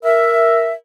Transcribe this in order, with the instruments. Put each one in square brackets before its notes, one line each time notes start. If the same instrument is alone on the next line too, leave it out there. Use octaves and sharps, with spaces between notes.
[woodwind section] A#4 E5